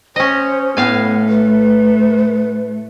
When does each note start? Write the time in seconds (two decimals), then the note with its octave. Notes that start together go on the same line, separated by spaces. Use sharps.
0.16 C#4 C5 D#5
0.77 A2 A3 B3 F5 G#5
1.29 B4